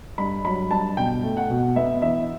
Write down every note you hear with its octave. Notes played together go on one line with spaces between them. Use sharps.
G2 B5
F#3 B5
G2 A5
B2 G5
A3
F#5
B2
B3 E5
E3 E5